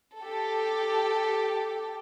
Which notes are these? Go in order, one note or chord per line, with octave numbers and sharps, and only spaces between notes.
G4 A4